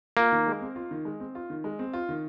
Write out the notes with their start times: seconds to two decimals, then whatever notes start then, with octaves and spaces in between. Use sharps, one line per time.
0.17 A#3 F4
0.32 D#3
0.47 G#3
0.61 C4
0.76 F4
0.91 D#3
1.05 G#3
1.20 C4
1.35 F4
1.50 D#3
1.64 G#3
1.79 C4
1.93 F4
2.09 D#3